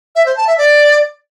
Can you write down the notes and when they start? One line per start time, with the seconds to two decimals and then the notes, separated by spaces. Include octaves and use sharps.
0.16 E5
0.26 C5
0.37 A5
0.47 E5
0.58 D5